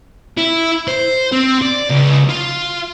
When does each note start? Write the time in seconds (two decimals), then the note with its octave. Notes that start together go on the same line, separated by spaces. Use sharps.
0.38 E4
0.88 C5
1.32 C4
1.62 D5
1.91 C#2
2.29 F4